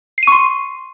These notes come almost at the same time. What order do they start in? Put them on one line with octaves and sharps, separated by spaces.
C7 D#7 C#6 C6